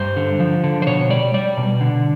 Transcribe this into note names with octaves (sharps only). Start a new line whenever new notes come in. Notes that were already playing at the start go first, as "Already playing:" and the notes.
Already playing: G2 C5
D3
F3
D3
C5
B2 C#5
G3 D5
G3 D5
B2
D3